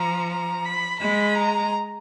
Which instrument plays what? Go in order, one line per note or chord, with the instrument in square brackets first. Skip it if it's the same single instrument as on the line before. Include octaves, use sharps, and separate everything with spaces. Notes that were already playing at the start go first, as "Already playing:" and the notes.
Already playing: [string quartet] F3 [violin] A#5
[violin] A#5
B5
[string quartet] G#3 [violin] B5
[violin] A#5